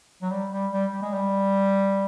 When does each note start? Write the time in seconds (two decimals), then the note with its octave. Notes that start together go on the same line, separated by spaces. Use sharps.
0.22 F#3
0.31 G3
0.52 G3
0.71 G3
0.92 G3
1.02 G#3
1.14 G3